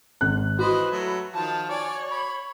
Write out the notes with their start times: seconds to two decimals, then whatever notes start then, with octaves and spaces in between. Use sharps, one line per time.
0.21 G#1 F#6
0.59 E3 F#4 B4 C5 D#5
0.91 F#3 A3
1.33 D#3 F3 A5
1.70 C#5 D5 G#5
2.11 B5